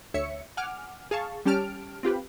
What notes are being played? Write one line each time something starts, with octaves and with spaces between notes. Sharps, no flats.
D2 C#5 E5 C#7
F#5 G#5 D6 F6
G#4 F5 A5 C#6
G3 C#4 G4 A5 F6 D7
C4 F4 G4 B4